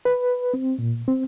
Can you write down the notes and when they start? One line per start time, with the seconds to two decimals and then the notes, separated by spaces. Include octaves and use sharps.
0.05 B4
0.54 C4
0.78 A#2
1.08 C4